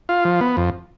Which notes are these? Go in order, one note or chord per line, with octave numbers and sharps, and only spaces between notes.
F4
F3
B3
F2